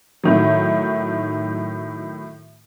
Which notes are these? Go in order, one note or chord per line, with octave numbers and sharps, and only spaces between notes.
A2 D#3 F#3